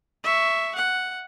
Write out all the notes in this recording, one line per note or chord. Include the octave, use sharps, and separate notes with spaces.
E5 C#6
F#5